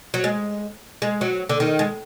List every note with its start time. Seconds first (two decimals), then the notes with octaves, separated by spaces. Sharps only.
0.14 F#3
0.24 G#3
1.02 G#3
1.21 F#3
1.49 D3
1.60 D#3
1.79 G#3